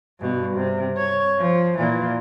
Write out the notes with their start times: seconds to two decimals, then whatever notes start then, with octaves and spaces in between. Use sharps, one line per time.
0.20 G2 B2
0.56 C3
0.97 C#5
1.39 F3
1.77 A#2 E3